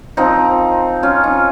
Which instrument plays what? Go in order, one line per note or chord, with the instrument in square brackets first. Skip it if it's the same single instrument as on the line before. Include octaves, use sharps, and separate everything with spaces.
[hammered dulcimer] F3 C4 D#4
C#4 F4
D#4